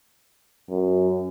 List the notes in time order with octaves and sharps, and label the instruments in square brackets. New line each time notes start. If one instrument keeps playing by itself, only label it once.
[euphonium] F#2